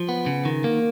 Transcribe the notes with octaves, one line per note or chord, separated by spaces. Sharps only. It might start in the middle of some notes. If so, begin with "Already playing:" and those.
Already playing: F3
B3
C#3
D#3
A#3